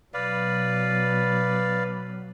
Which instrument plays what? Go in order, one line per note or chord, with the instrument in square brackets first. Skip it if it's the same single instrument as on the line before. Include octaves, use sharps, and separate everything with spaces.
[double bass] B2 F#3 [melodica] B4 D5 F5